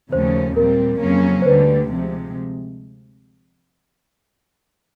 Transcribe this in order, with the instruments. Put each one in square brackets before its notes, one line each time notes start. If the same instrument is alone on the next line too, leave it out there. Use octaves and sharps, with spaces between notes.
[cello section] D#2 C#3 F3 A3 C#4 [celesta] C5
[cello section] A#2 G3 C4 [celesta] A#4
[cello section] F2 C#3 F#3 A#3 C#4
[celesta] C5
[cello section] D2 D3 G3 [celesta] B4
[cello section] C3 F3 G#3